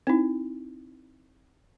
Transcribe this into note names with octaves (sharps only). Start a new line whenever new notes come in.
C4 D#4 E4